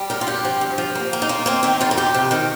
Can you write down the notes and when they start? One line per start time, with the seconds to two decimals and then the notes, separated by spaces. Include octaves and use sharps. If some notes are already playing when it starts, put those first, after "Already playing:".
Already playing: G3
0.10 G2 A#4
0.21 F4
0.27 G2 G4
0.45 F3
0.61 G2
0.78 F3
0.95 A#3
1.13 A#3
1.22 D#4
1.29 A#3 F4
1.46 A#3 C4
1.63 D#3 C4
1.81 F2 F4
1.91 A#4
1.97 F2 G4
2.14 C3
2.31 D#3 A#4